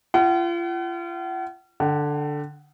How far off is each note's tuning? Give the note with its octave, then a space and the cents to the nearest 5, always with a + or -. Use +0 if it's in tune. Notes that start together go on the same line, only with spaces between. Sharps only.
F4 -35 F#5 +40
D3 +0 G5 -45